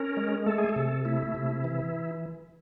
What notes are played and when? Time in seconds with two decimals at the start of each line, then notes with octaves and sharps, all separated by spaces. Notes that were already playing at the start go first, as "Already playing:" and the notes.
Already playing: C#4 A#4
0.17 G#3
0.46 A3 A4
0.58 G#4
0.69 A4
0.76 C3
1.05 A3 E4
1.35 C3
1.64 E3